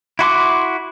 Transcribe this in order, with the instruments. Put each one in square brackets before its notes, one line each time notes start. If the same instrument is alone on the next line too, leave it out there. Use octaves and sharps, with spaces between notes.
[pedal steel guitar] E4 F#4 C6 D6